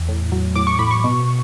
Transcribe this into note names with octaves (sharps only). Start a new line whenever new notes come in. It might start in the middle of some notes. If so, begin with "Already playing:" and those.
Already playing: E2
A2
F#3
A2 D6
C#6
A2 B5
C#6
B2